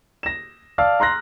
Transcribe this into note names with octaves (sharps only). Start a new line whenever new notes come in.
A#6 E7
D5 F5 A5 E6 F6
A#5 C6 F#6 A#6